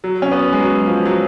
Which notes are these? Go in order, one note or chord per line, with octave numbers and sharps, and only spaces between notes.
F#3
C#4
B3
G#3
F#3
F3
F#3